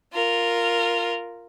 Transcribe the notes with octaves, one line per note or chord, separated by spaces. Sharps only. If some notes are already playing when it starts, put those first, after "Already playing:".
F4 A#4